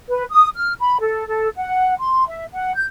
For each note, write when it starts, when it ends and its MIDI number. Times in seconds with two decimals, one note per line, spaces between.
0.09 0.24 71
0.32 0.48 87
0.55 0.73 89
0.79 0.97 83
1.01 1.27 69
1.27 1.49 69
1.56 1.94 78
2.00 2.27 84
2.28 2.45 76
2.54 2.73 78
2.76 2.84 91